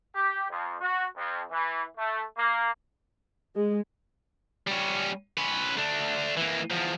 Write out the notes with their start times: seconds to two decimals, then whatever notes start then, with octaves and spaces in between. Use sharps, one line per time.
0.14 G4
0.49 F2
0.81 F#4
1.16 F2
1.50 E3
1.97 A3
2.37 A#3
3.56 G#3
4.67 G3 C#4
5.38 C#4 B4
5.78 A3 D4
6.37 E3 A#3
6.70 E2 F3